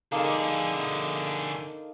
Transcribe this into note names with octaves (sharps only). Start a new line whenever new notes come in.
D3 A#3 D#4 G#4 A4